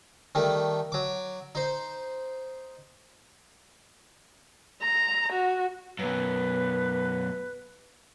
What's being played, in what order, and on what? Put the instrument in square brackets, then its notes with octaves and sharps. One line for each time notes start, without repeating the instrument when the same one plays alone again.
[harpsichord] D#3 G3 A3
F#3 D6
D#4 C5
[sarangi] A#5
F#4
[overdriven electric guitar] F#2 B2 [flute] B4